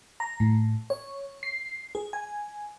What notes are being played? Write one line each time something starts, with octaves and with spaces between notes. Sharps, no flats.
A#5
A2
C#5
C7
G#4
G#5